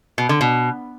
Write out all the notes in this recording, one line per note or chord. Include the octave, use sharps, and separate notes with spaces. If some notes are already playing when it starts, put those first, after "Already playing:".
B2
D3
B2